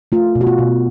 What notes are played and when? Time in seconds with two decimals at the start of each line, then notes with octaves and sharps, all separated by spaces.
0.12 A3 F4
0.35 B2
0.41 F#4
0.47 F4
0.58 B2